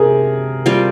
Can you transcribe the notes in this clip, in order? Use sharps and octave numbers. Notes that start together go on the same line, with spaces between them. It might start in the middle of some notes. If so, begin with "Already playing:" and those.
Already playing: C3 G#4 A#4
G3 C4 F4